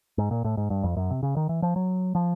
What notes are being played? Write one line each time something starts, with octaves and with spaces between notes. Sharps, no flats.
G#2
A#2
A2
G#2
G2
F2
F#2
C3
C#3
D#3
E3
F3
F#3
F3